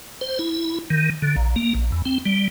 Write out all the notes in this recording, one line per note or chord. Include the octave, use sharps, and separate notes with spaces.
C5
E4
D#3
D3
A#1
A#3
A#1
E2
C4
G3